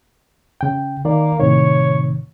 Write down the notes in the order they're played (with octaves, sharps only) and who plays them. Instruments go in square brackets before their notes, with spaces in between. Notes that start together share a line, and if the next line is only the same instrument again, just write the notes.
[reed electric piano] C#3 G5
[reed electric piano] D#3 D5 [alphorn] A#3
[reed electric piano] A2 C3 D#3 [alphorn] C#5